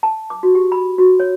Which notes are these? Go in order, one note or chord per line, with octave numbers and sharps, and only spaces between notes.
A5
D6
F#4
G4
B5
F#4
C#5